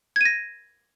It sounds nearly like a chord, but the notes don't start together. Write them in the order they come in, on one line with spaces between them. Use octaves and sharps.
G#6 D#7 A#6